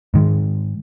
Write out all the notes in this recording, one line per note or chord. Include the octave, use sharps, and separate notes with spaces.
G#2 D#3 G#3